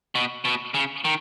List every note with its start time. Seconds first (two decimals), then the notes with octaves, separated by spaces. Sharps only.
0.15 B2
0.45 B2
0.74 C#3
1.05 D#3